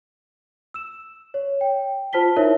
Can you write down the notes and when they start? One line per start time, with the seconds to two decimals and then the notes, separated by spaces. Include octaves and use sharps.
0.74 E6 E7
1.34 C#5
1.61 G5
2.13 F4 C5 A5 B6 G7
2.36 D#4 E4 A#4 C#5 E5